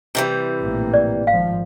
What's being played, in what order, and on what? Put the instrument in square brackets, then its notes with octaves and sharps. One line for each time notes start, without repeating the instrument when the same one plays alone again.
[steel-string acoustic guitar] C3 E3 G3
[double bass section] A#1 A2 A#3
[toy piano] D5
[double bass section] G#1 F3 [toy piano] F5